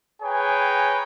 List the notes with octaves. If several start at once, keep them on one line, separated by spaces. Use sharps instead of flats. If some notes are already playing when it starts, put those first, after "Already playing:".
G#4 B4 C#5 G5 G#5 A#5